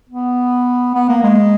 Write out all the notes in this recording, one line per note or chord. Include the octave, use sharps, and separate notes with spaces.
B3
B3
A#3
G#3